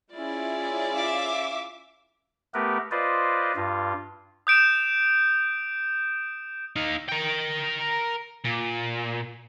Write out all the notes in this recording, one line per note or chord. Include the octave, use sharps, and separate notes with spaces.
C#4 E4 F4 G#4 D5
E5 F5 D6
A3 B3 G4 A#4 B4
F4 B4 C5 D5 D#5
G2 F4
D#6 G6 D7 E7
D#4 F5
A#4 G5
A#2